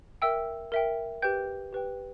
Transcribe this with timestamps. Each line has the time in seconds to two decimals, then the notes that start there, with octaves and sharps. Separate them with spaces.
0.22 A#4 E5 G5 E6
0.72 A#4 E5 G5
1.22 G4 B4 G5 G6
1.72 G4 B4 G5